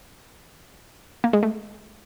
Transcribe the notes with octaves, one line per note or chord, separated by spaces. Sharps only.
A#3
G#3
A3